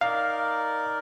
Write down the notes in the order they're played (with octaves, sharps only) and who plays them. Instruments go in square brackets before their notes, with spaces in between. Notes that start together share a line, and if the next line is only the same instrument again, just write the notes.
[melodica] D#4 A#4 D5 [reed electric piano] F5